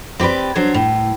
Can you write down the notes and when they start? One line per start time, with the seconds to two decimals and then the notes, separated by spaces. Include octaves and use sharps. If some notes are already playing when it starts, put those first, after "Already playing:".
0.20 C4 G4 A4 B4 D5
0.55 F#3 D4 C5 C#5
0.74 A2